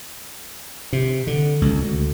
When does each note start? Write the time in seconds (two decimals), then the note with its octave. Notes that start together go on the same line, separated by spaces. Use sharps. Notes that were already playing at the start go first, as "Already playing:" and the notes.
0.93 C3
1.27 D3
1.62 C#2
1.81 D2